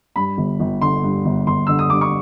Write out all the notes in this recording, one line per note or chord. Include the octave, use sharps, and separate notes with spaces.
G2 B5
G1
G1
D3 C6
G2
G1
G1 C6
D3 E6
D#6
G2 D6
C#6